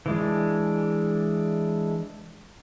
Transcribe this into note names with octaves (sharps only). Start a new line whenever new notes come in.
E3 G#3 D4